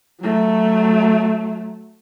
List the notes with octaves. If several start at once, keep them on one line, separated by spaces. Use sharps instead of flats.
F#3 A3